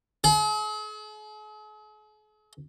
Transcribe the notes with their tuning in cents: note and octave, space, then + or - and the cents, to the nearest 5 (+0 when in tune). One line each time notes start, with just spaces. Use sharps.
G#4 +45